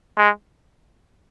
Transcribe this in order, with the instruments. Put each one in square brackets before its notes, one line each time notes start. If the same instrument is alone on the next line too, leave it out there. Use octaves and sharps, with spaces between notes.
[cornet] G#3